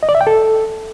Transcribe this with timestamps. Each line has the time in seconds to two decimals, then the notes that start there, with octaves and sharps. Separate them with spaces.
0.03 D#5
0.09 D5
0.15 E5
0.21 G5
0.27 A4